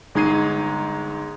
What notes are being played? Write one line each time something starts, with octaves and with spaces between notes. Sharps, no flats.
G1 G#3 D#4 G#6 C7 D#7